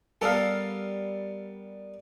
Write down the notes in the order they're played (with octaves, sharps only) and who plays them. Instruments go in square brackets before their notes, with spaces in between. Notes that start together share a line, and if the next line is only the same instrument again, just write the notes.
[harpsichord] G3 B3 A#4 [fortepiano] A4 F5